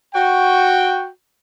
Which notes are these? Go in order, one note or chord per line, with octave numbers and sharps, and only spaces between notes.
F#4 G5